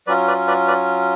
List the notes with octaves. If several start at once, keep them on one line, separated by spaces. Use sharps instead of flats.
F#3 C#4 F4 B4 D5
B4 D5
B4 D5
B4 D5